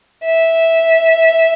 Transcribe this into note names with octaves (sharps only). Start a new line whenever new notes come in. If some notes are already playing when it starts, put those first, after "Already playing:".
E5